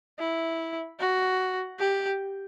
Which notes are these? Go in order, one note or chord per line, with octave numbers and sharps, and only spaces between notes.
E4
F#4
G4